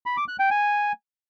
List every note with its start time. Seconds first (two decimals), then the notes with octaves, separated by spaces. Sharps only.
0.06 B5
0.17 D6
0.28 F#6
0.39 G5
0.51 G#5